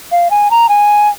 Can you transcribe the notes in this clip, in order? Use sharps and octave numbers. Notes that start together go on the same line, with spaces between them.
F5
G#5
A#5
G#5